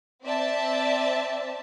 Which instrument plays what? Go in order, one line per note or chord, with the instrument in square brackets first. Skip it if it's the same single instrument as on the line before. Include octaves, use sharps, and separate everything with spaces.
[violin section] C4 D5 E5 A5